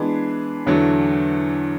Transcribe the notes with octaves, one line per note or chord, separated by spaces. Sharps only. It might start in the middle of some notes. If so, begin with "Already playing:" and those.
Already playing: E3 G#3 B3 D4 G#4
E2 D3 F#3 A3